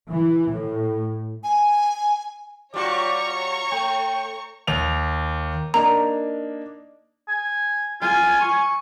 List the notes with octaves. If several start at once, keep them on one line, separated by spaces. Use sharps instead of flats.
E3
A2
G#5
G3 F4 F#4 C#5 D5 A#5 C#6
A3 G5
D#2 F7
A#3 D4 D#4 A#5
G#5
F4 G#5
C#6